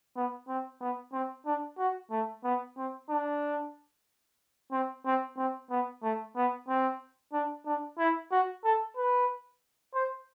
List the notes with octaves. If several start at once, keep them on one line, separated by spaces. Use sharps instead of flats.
B3
C4
B3
C4
D4
F#4
A3
B3
C4
D4
C4
C4
C4
B3
A3
B3
C4
D4
D4
E4
F#4
A4
B4
C5